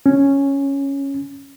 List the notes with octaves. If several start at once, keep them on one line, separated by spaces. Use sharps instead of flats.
C#4